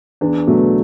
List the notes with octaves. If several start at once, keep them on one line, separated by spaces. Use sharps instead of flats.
E2 D4
B2 F#3 A3